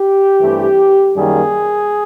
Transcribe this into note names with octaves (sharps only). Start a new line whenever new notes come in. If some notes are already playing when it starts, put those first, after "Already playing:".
Already playing: G4
G2 E3 A3 C4
F#2 D#3 G3 A#3 G#4